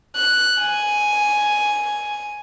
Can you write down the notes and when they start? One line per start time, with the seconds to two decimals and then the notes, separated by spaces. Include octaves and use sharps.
0.15 F#6
0.60 G#5